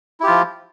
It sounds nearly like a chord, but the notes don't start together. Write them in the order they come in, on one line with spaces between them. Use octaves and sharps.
E4 G4 F4 F3